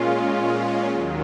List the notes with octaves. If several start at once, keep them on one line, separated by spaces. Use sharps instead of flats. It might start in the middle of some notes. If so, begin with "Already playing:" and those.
Already playing: A#2 G#3 C#4 F4
D#2 D#3 F#3